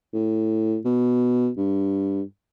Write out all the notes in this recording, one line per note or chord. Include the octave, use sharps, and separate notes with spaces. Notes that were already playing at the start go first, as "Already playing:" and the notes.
A2
B2
G2